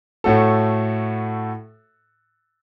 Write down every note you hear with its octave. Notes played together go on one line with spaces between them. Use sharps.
A2 A3 F#4 A4